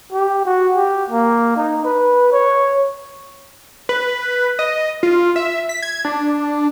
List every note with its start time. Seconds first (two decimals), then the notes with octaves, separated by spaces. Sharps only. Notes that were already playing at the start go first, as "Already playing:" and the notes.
0.12 G4
0.45 F#4
0.75 G4
1.10 A#3
1.56 D#4
1.85 B4
2.32 C#5
3.89 B4
4.59 D#5
5.03 F4
5.36 E5
5.69 B6
5.82 G#6
6.05 D4